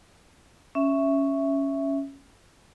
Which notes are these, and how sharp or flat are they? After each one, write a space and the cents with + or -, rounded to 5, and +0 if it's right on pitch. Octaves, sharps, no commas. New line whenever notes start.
C#4 +0 E5 +0